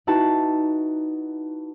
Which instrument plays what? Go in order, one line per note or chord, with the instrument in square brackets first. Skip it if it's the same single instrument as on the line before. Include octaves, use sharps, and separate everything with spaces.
[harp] D#4 E4 F#4 B4 A5